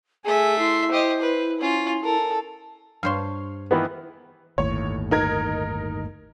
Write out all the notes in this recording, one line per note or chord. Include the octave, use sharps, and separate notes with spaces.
A3 G#4 E5 G#5
E4 C6
G4 C5 D#5
B4
C#4 F4
A4 A#4
G2 C5 C#5 F5 C6
D#3 E3 B3 B4
G1 D#2 A2 C#5
D#4 A#4 G#6